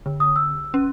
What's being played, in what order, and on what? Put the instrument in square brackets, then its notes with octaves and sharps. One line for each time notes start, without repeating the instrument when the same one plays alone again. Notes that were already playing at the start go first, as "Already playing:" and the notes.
[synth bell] D3
[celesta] D#6
E6
[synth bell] C#4